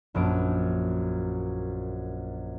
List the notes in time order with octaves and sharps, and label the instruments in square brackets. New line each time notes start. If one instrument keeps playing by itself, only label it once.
[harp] A#1 F#2 D7